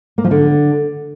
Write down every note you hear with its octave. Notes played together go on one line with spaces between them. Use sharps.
A#3
F3
D3